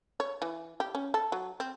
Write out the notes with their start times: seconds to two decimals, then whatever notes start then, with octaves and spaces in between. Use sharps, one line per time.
0.20 C#5
0.42 E3
0.80 G4
0.95 C#4
1.14 A4
1.32 F#3
1.60 C4